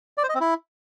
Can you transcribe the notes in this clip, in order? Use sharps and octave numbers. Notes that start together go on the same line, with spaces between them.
D5
C5
D#5
C4
E4